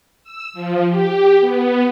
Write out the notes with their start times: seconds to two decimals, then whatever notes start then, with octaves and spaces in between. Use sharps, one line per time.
0.23 E6
0.53 F3
0.87 G4
1.40 B3